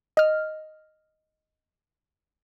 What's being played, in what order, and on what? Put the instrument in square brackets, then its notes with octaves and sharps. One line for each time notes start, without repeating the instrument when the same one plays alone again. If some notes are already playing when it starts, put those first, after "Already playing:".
[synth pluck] D#5 F6